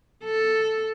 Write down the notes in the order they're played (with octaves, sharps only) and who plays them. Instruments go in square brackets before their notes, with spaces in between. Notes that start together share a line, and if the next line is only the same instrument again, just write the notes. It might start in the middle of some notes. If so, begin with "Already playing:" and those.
[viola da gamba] A4